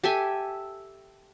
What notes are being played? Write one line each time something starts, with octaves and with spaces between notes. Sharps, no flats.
G4 A4 E5 G#5